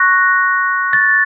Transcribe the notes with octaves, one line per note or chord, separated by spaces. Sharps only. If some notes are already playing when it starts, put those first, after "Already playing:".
Already playing: C#6 F#6 A#6
A6